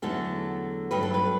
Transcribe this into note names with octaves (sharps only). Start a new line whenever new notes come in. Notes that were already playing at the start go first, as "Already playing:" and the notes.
E2 D3 F#3 A3 A4
G2 F#3 A3 B4
A4
B4